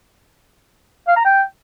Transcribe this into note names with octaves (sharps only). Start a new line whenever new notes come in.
F5
A#5
G5